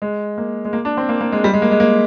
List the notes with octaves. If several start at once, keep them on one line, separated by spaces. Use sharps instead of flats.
G#3
A#3
G#3
A#3
D4
C4
A#3
A#3
G#3
G3
G#3
A#3
G#3
A#3